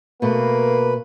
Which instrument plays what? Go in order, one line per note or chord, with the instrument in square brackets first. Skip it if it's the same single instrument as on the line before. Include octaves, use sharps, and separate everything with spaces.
[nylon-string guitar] B2 A3 [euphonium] A#3 [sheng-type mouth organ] B4